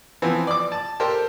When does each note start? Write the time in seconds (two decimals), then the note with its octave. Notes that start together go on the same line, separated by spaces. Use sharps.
0.22 E3 F3 B3 C4
0.47 D5 D6
0.72 A5
1.00 G4 A4 A#4 C5 G5